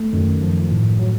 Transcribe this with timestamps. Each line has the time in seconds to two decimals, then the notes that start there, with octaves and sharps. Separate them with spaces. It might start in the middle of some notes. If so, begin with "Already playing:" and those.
Already playing: A3
0.13 F#2 D#3
0.43 F3
0.71 A2
0.99 F#3